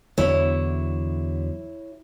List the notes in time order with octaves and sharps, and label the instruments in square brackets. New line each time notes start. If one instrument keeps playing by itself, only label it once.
[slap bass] E2 D3 F#3 [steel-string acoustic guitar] E4 C#5